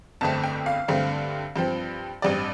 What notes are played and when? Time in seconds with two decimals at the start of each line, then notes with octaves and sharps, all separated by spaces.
0.21 G1 F2 D3 A3 C4 A5
0.43 G5
0.66 F5
0.88 G2 D3 A3 C4
1.56 G2 F3 C4
2.22 A1 G2 G3 C4 D5